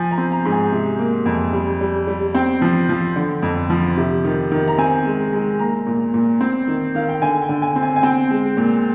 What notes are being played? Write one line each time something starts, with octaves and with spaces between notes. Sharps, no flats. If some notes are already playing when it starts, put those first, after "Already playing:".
Already playing: F3 G#5
A#5
C4
A#5
G#2
G#5
C3
A#3
F2
G3
G3
G3
C4 G5
F3
F3
D3
F2
F3
C3
D#3
D#3
A#5
C4 G#5
G#3
G#3
A#3 A#5
A#2
A#2
C4
D#3
D#3 F5
G5
D3 G#5
G5
D3
G#5
C4
G#5
G#5
C4 G5
G#3
A#2